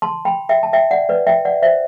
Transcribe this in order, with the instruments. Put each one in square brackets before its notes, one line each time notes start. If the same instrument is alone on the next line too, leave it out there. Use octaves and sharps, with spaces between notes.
[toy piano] A5 C6
G5 B5
E5 G5
A5
E5 G5
D5 F#5
B4 D5
E5 G5
D5 F#5
C5 E5